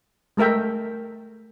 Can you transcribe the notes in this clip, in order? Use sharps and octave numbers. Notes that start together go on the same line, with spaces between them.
G#3 A3 A#4 E5 G5